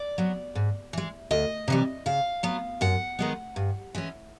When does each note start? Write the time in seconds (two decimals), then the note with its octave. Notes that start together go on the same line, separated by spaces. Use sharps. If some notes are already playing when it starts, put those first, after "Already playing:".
Already playing: D5
0.18 F#3 B3
0.55 G#2
0.93 E3 G#3
1.31 D2 D#5
1.68 C3 E3 G3
2.06 C#3 F5
2.43 F#3 B3
2.81 F#2 F#5
3.19 D#3 G#3 B3
3.56 G2
3.95 E3 G#3 C#4